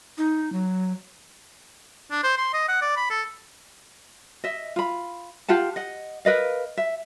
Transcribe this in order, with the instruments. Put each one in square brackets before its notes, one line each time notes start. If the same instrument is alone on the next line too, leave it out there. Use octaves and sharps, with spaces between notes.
[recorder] D#4
F#3
[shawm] D4
C5
C6
D#5
F#5
D5
B5
A4
[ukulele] D#5 E5
F4 B5
F4 G4 F#5 A5
D#5 F#5
A#4 B4 D#5 F5
E5